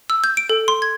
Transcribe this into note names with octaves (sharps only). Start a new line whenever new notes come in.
E6
G6
D7
A4
C6
G#6